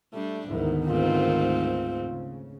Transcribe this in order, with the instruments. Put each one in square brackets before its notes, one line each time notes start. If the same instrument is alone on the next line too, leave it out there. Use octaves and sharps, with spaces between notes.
[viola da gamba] G3 D4 [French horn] A3
[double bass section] D2 D#3 B3 [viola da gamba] G#2 [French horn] E4
[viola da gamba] G#2 A3 C4 [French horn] F4
[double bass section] C#3